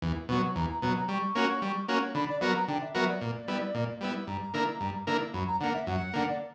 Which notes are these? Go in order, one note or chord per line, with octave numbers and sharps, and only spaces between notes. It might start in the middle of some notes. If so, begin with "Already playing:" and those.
E2
B2 F#3 C#6
E2 A#5
A#5
B2 F#3 A#5
A#5
G3 C#6
A#3 C#4 F#4
G3
A#3 C#4 F#4
D3 B5
D5
F#3 B3 F#4 A#4 F#5
A#5
D3 G5
E5
F#3 B3 F#4 A#4 E5
D5
A#2
G3 B3 E4
A#2
G3 B3 E4
G2 A#5
D3 A#3 E4 A#4
G2
D3 A#3 E4 A#4
F#2 B5
A#5
D3 A#3 F#5
E5
F#2 F#5
D3 A#3
D5